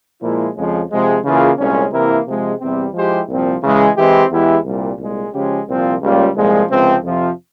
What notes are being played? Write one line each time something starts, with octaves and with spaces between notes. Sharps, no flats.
A#2 F3 G#3 E4
F2 C#3 F3 G#3
C3 F3 G#3
C#3 E3 A#3 F4 G#4
C2 A#2 G#3 C#4
C3 E3 A#3 E4 A#4
C3 F3 G#3
E2 C3 G3 C4
F3 G#3 E4 G4 C5
C2 A#2 F3 C4
C#3 E3 G#3
E3 G#3 C4 E4 G4
E2 E3 G#3 E4 G4
C2 A#2 G3
C2 A#2 G#3
C#3 F3 G#3 C#4 G4
C2 A#2 F3 C4 F4
C#2 C#3 G3 A#3 F4
C2 A#2 F3 G#3
C#2 C3 F3 C4
F2 C3 F3